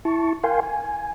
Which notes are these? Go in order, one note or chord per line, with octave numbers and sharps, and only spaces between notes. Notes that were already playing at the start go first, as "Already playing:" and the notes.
E4 A5 C#6
A#4 F5 G5 G#5 C6
G#5